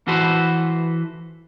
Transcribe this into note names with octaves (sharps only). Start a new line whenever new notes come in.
E3 F#4 A4 B4 C5